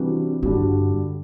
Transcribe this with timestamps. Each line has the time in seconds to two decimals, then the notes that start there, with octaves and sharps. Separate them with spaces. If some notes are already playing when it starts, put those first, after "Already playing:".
Already playing: C3 E3 G3 D4 F#4
0.43 G2 D3 G3 D4 F#4